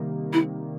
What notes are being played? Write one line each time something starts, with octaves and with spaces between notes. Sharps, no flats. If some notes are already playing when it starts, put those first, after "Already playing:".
Already playing: C3 D#3 G3 A#3
C3 E4